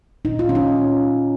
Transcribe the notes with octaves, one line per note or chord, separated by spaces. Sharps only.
A#2 D#4
F4
C#4
F3 D#4